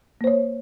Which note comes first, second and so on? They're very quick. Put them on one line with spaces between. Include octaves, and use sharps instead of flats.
A#3 C5 C#5